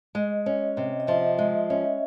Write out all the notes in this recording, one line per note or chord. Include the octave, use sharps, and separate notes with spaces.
G#3 D#5
C#4
C3
D#5
F3 E5
G#3
C#4